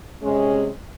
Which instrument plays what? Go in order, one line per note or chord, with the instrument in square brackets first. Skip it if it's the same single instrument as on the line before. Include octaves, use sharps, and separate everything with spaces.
[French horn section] C3 G#3 C#4